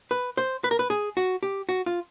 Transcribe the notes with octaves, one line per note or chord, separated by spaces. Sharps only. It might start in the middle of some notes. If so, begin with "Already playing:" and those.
B4
C5
B4
A#4
B4
G#4
F#4
G4
F#4
F4